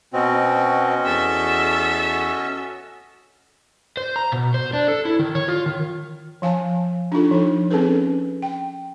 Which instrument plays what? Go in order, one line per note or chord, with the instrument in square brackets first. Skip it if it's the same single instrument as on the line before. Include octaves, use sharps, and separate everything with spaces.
[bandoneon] B2 C4 [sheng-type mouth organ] C#4 F#4 D#5
[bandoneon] E2 [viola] A4 E5
[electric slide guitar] C5
A#5
B2
C5
D4
A4
E4
D#3
C#5
F4
D#3
[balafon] F3 F5 G#5 A5
D4 D#4 F4 A4
F3 D#4
C4 C#4 G#4 A4 B4
G5